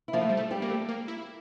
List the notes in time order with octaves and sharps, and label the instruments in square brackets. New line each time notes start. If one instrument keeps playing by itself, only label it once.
[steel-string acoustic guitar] E4
[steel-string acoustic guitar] F3 F4 [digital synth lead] A#3
[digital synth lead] A3
G3
A3
[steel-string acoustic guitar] G3 G4
[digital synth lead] A#3
A3
A#3
E4